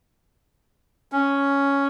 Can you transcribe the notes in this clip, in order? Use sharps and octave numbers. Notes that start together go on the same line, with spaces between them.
C#4